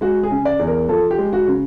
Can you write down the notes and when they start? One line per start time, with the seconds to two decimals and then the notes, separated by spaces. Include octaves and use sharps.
0.01 G#3 F#4
0.23 G#4
0.30 C#3
0.45 D5
0.59 E2
0.67 A#4
0.89 F3 A4
1.11 G4
1.18 G#3
1.33 F#4
1.47 C#3